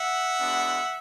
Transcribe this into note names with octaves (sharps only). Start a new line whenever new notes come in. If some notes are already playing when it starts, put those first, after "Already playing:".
Already playing: E5 F#5
G#3 B3 D4 F#4